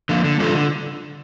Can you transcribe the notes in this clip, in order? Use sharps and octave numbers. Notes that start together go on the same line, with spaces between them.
D3 F3 A#3
D3
G3 D4 F4 A4
D3